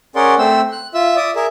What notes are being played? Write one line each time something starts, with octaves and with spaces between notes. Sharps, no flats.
C#4 G#4 A#4 D5 F#5 C6
A3 C4 C5 E6
F#6
F4 E5 E6
D5 E5 D#6
G#4 A#4 E5